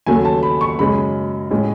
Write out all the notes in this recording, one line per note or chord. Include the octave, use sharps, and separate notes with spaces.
D#2 C#3 F#3 A3 C#4 G#5
A5
B5
C#6
F#2 C#3 G#3 C#4 B5
A2 G#3 C#4